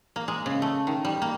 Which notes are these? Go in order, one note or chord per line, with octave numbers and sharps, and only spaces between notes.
A#3
G#3
C#3
A3
D#3
G3
A#3